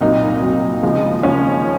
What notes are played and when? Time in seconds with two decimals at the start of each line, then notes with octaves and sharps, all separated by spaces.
0.01 C2 A#2 F#3 D#4
0.42 C2 A#2 F#3
0.82 D#2 C#3 F3 G#3
1.23 D#2 C#3 F3 G#3 C#4